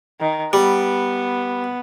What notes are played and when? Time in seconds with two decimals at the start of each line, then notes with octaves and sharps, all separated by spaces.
0.20 D#3
0.53 G3 B3